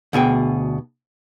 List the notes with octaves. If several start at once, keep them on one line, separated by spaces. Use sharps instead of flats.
D2 B2 G#4 G5